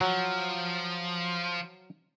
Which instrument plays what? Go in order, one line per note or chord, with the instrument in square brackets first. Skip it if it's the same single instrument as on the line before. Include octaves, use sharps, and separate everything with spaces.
[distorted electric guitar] F3 [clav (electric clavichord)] F#3